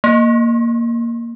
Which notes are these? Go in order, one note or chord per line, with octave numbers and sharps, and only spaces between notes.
A#3